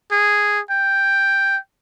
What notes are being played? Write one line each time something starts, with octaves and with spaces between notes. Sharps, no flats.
G#4
G5